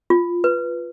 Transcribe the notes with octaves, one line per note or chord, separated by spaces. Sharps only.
F4
B4